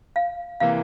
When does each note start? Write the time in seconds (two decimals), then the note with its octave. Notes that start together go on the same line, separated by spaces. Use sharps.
0.16 F5
0.60 C3 E3 A#3 F5